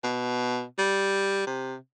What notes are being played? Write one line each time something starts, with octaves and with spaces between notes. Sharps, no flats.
B2
G3
C3